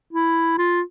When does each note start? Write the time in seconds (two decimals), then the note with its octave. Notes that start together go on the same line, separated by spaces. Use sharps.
0.13 E4
0.58 F4